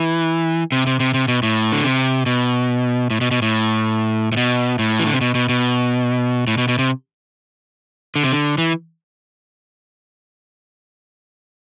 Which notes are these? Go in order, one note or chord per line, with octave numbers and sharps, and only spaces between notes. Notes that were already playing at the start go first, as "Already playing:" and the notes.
Already playing: E3
C3
C3
C3
C3
B2
A2
D3
C3
B2
A2
B2
B2
A2
A2
B2
A2
E3
D3
C3
B2
B2
B2
A2
B2
B2
C3
D3
C3
D3
E3